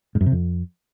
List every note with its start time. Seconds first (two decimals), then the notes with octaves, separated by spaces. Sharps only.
0.15 G#2
0.21 F#2
0.26 C3
0.32 F2